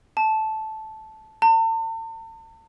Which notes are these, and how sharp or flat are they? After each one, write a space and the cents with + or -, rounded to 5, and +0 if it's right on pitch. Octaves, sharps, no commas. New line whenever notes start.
A5 -10
A5 +40